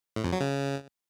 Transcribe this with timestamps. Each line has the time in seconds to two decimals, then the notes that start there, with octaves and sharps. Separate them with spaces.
0.16 A2
0.24 F2
0.32 F#3
0.40 C#3